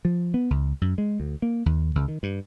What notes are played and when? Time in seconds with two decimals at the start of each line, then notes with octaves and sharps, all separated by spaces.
0.05 F3
0.34 B3
0.50 C#2
0.81 F#2
0.98 G#3
1.20 D2
1.42 A#3
1.66 D#2
1.95 C#2
2.08 D#3
2.23 G2